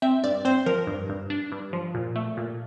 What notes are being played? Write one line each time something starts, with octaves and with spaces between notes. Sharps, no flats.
C4 E5
G2 D5
C4 C5
F3 A#4
G2
G2
D4
G2
F3
A#2
A3
A#2